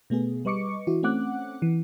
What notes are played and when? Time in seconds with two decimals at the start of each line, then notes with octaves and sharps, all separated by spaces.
0.10 B2 A3 B3 G#4
0.45 G3 B4 D#5 C#6 D6 C#7
0.87 E3 E4 F#4
1.03 A3 C4 C#4 F#5 D6 F#6
1.62 E3